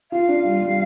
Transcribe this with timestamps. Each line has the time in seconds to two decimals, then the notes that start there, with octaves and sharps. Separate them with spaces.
0.11 F4 F5
0.28 D4
0.45 G3
0.61 G3